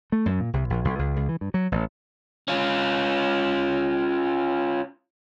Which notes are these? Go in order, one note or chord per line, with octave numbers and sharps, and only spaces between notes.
A3
F#2
A#2
C2
A#1
B1
C#2
C#2
E3
G2
F#3
A1
C#4 F4